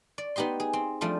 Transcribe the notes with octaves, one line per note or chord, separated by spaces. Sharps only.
D5
B3 D#4 G4 D#5 C6
G#4
C4
F3 G3 A3 D4 F4